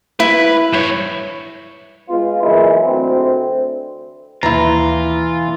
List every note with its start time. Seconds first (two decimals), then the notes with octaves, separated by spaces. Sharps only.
0.20 E4 B4
0.73 G2 C#5
2.09 G#3 B3 F4
2.42 E3 F#3 G#3 A#3 E4
2.85 D2 C4
4.43 D#2 B2 E3 E4 F4 A#5